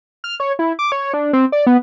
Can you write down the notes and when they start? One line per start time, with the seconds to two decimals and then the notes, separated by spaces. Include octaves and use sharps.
0.24 F6
0.40 C#5
0.59 E4
0.79 D6
0.92 C#5
1.14 D4
1.33 C4
1.52 D5
1.67 B3